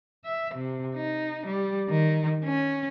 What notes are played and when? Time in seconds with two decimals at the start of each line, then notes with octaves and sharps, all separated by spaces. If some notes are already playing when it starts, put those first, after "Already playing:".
0.24 E5
0.54 C3
0.95 D#4
1.46 G3
1.89 D#3
2.45 C#4